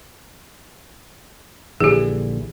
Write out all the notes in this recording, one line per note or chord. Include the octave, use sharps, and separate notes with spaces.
A#1 D3 E3 G4 G#4